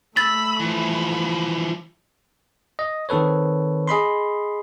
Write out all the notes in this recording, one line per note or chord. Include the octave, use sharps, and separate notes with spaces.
A3 B5 E6 A6
E3 F3 B5
D#5
D#3 C4 A4 B4 C#5
G#4 D#5 B5 C6